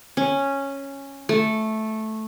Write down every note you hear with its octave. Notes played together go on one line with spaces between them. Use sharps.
C#4
A3